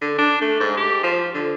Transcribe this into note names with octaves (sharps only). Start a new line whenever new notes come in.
D3
D4
A3
G#2
G4
F3
D3